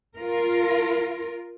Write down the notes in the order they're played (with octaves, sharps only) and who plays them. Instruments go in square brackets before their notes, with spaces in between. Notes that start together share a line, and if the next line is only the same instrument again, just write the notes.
[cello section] F4 A#4